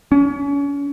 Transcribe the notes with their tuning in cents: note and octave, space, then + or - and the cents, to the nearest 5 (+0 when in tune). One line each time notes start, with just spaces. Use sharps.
C#4 +35